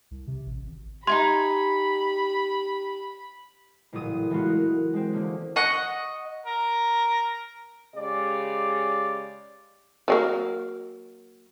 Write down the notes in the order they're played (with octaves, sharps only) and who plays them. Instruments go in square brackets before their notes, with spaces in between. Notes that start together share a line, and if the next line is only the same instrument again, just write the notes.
[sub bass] C2
C3
A1
G#1
[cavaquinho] D#4 E4 G#5 [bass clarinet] G4 [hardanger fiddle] B5 [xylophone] C6
[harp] A1 A#2 C#3 F#3 D#6
E3 G#3 A3 B3 F4 F#4
A#4
G#3 C4
D3 A#3 C#4
[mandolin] D#5 F#5 C#6
[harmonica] A#4
[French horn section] C#3 G#3 G4 D5
[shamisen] F3 F#3 A#3